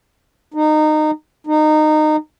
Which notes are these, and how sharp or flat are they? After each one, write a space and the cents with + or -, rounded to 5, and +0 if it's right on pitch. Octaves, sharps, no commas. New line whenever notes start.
D#4 -20
D#4 -20